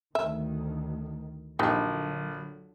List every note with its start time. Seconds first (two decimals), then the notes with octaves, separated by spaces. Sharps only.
0.15 D2 D#3 E5
1.59 A#1 D3 F#3 D#4 G4